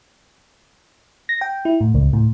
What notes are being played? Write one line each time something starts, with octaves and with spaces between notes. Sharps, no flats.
A#6
G5
E4
A2
C#2
A2